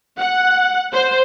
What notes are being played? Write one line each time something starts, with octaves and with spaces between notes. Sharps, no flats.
F#5
C5